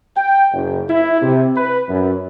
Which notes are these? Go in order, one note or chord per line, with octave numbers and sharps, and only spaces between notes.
G5
F#1
E4
C3
B4
F#2